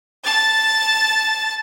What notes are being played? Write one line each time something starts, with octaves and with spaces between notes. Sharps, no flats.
A5 A6